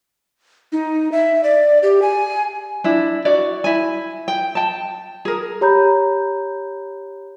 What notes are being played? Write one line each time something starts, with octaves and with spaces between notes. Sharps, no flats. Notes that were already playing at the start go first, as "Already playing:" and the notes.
D#4
E5
D5
G4
G#5
D4 E4
F#4 D5
E4 G#5
G5
G5 A5
G#4 A#4
G4 C#5 A#5 B5 G6